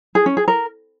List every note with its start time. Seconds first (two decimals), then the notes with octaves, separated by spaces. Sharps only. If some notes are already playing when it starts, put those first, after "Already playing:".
0.15 G#4
0.26 C#4
0.37 G#4
0.48 A#4